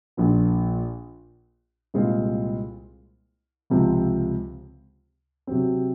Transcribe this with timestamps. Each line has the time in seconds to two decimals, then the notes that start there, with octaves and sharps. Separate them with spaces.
0.17 A#1 A#2 F3
1.94 C2 A#2 G#3 C4 F4
3.70 C#2 C3 F3 C4
5.47 C3 F#3 C4